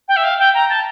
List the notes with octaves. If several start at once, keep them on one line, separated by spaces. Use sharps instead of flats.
G5
E5
F5
G5
A#5
A5